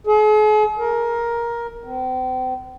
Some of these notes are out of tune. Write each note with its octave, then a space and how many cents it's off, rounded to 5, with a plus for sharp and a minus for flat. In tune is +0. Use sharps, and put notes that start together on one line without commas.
G#4 +45
A#4 +10
C4 -40